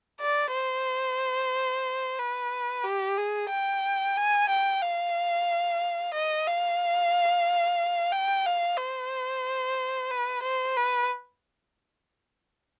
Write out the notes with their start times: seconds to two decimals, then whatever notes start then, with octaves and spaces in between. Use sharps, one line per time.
0.21 D5
0.53 C5
2.18 B4
2.84 G4
3.18 G#4
3.50 G5
4.17 G#5
4.49 G5
4.82 F5
6.14 D#5
6.48 F5
8.12 G5
8.46 F5
8.78 C5
10.10 B4
10.42 C5
10.77 B4